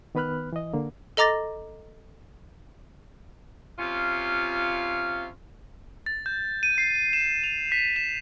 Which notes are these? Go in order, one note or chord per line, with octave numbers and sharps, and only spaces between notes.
D#3 B3 B4 B5 F6 F#6
E3 D#5
D3 A#3
A4 D#5 A#5 D6 A6 A#6
C3 C#4 F4
A6
G6
D#7
C7
E7
F7
B6
E7